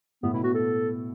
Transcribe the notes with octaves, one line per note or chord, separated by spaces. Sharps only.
A2 B3
B2 E4
B2 F#4
A4